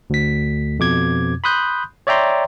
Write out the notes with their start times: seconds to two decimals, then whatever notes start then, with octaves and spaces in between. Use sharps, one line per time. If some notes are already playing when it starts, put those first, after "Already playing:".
0.10 D2 B6
0.79 F2 B2 D6 G#6
1.44 B5 C6 D#6 F#6 G6
2.07 C#5 D5 E5 G5 A#5 C6